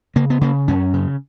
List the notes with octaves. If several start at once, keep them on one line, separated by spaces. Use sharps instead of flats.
C#3 A#3
B3
C#3 A#3
F#2 C#4
C#3